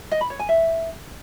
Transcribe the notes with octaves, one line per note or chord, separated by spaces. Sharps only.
D#5
B5
C#5
G#5
E5